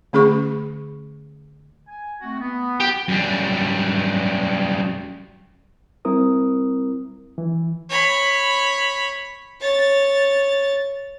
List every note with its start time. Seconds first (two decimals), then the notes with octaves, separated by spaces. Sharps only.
0.13 D3 A3 C#4 G#4 B5 C#6
1.88 G#5
2.21 A3 C4 F#4
2.40 B3
2.80 G4
3.08 F#2 G3
6.05 G3 C4 E4 A#4 D#6
7.38 E3
7.90 C#5 B5
9.61 C#5 A6